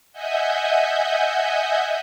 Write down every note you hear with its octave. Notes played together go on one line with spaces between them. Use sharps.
D#5 E5 F#5 G#5 G6